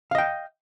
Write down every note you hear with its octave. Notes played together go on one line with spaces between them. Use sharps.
D#5 F5 G5